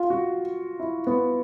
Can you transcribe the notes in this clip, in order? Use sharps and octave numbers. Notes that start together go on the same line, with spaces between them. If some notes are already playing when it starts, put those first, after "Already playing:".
Already playing: F4
F#4
E4
B3